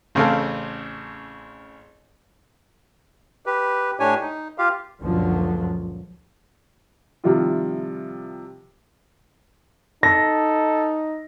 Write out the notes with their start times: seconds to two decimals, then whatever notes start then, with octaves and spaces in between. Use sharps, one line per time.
0.15 A1 C#3 C4 A4 F5
3.46 G4 B4
4.00 A2 D4 G4 C#5 G#5
4.21 D#4
4.58 F4 G4 F5
5.01 C#2 F#2 A#2 D3 F3 F#3
7.24 C3 D#3 F3 G3 E4 F4
10.03 D#4 A4 A#6